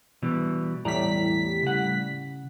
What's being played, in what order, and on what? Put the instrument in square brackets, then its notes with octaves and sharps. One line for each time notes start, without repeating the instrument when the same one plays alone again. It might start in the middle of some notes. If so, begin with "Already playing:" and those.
[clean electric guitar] B2 E3 G3
[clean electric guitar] E2 D5 A#5 [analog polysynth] A2 G3 B6
[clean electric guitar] C#3 F#5